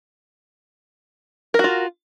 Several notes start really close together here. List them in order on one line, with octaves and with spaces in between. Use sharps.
A#4 F#4 F4